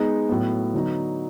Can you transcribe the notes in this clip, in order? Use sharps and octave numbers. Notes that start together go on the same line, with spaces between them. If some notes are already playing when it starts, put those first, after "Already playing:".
Already playing: G#3 B3 D#4
A2 F#3 B3
D3 F#3 B3 D#4